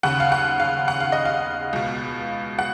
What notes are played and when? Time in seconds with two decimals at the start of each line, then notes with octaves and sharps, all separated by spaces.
0.03 D#2 C#3 F#5
0.20 F5
0.32 F#5
0.60 F5
0.88 F#5
1.00 F5
1.12 D#5
1.25 F5
1.73 C#2 B2
2.59 F#5